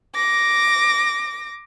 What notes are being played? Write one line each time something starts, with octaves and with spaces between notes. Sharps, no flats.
D6 A#6